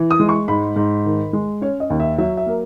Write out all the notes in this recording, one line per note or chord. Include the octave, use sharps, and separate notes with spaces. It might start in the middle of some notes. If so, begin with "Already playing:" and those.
Already playing: E3
D#6
G#3
C#6
G#2 B5
G#2
D#3
G#3
C#4 C#5
D#5
D#2
E5
F#3 E5
E5
A#3